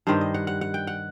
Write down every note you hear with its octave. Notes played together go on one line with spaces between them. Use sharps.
G2 D#3 G3 C5
D#5
F#5
F#5
F#5
G5
F#5